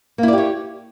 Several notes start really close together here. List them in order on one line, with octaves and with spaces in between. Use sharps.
A#3 E4 D5 G4 C#5